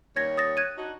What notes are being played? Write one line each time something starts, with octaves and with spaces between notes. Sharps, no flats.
D#2 G3 C#5 G#6 A#6
D#6 A6 A#6
F#6 G#6 D#7
D4 D#4 F#4